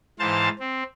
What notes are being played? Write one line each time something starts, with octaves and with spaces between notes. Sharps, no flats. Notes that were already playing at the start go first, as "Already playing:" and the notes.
G#2 E3 C5 F5 A5 A6
C4